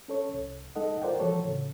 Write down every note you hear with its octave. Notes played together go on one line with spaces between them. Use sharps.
C#4 A4 C#5
C2
G#3 D#4 A4 D#5 F#5
F4 A#4 C5 D5 F#5 G5
E3 F3 G#3 F#4 A4 C#5
A2 C#3